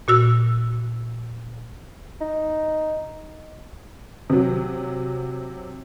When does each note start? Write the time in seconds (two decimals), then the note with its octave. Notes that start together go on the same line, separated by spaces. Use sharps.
0.08 A#2 F#4 E6
2.21 D#4
4.30 C3 F#3